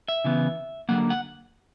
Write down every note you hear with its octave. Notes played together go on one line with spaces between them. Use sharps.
E5
C#3 E3 B3
D3 F#3 A#3 F#5
F#5